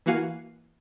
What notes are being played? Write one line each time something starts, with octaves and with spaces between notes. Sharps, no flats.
E3 A#3 F#4 F5 G#5 C7